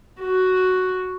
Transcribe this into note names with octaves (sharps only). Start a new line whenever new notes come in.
F#4